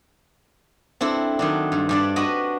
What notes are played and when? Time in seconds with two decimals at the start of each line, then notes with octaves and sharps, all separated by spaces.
1.01 C4 D4 E4 A4
1.39 D#3 F#3 D4
1.72 G2
1.89 G2 D4 D5
2.16 D4 F#4 B4 D#5